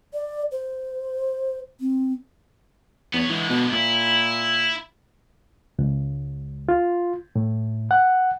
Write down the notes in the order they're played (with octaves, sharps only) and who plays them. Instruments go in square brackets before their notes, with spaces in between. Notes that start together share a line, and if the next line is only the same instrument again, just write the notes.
[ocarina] D5
C5
C4
[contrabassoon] E2 [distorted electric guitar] B3 C#5
[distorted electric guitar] D3 G#3 [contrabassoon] E3
[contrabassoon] B2
[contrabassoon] A#2 [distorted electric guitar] E4
[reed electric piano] C#2
F4
A2
F#5